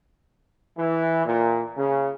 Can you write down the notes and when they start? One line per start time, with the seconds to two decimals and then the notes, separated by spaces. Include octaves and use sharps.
0.78 E3
1.26 A#2
1.77 C#3